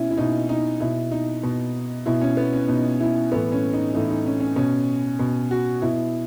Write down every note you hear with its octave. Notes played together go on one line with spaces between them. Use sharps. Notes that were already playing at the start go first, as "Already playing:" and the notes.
Already playing: B2 C#4 E4
E4
B2 D#4
D#4
B2 E4
D#4
B2
B2 E4
C#4
B3
C#4
B2 D#4
E4
A2 E3 B3
C#4
D#4
A2 E3 D#4
D#4
C#4
C#4
B2 C#4
B2
F#4
B2 E4